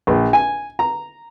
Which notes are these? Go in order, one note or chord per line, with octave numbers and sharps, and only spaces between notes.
A#1
G#5
A#5